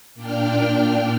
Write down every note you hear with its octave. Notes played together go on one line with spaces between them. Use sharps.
A#2 D4 G5 F6